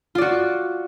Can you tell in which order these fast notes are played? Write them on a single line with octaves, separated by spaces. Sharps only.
F4 D5 F#4